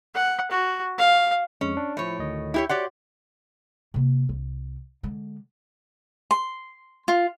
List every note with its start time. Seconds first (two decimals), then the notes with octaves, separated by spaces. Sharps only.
0.14 F#5
0.51 F#4
0.98 F5
1.61 F2 G#3 C#4
1.77 D4
1.97 A2 F3 E4 C#5
2.19 D2 D#3 D#5
2.54 E4 G4 C#5
2.69 F#4 G4 C#5 D5 F#5 C6
3.94 C3 A#3
4.29 C2
5.03 D3 G#3
6.31 C6
7.08 F4